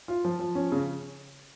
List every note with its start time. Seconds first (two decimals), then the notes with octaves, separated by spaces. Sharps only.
0.08 F4
0.25 F3
0.39 F3
0.55 C#4
0.72 C#3